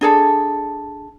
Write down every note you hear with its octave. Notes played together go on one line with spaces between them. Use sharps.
D4 G#4 A4